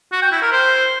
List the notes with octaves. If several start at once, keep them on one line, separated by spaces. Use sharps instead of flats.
F#4
G5
E4
A#4
C5